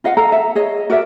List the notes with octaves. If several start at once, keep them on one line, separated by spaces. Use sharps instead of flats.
F4 D#5 F5 F#5
A4 F5 A#5
E5
G#4 C#5 D#5
F#4 A#4 D5 E5